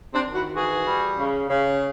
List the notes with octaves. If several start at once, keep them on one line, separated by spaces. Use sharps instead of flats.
C4 D4
D#3
E4 F#4
E3 F#4 G#4
G3
C#3
C#3